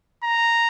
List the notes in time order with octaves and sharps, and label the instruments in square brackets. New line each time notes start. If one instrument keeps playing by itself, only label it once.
[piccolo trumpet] A#5